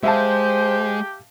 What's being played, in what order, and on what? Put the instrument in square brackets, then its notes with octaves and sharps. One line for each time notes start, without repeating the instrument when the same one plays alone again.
[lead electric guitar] G#3 [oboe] G4 [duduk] C5 [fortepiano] E5 F5 A5